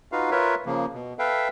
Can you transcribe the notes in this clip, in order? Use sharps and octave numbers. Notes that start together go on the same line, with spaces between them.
D#4 F4 F#4 B4 F5
F4 A#4 B4 C#5 E5
C#3 F3 A#3
B2
A4 B4 E5 F5 G5